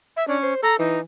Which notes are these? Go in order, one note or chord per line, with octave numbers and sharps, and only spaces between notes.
E5
C#4 D4
C5
A4 A#5
E3 D#4